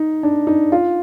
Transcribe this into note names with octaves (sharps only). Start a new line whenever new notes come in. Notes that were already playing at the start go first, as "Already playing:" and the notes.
Already playing: D#4
D4
D#4
F4